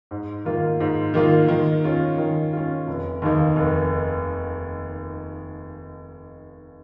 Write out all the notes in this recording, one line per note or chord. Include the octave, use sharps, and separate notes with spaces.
G#2
D#3 A#3 F4
G#2
D#3 A#3 F4
D#3
C#4 F4
D#3
C#4 F4
F1
D#2 D#3 A#3 D#4
F1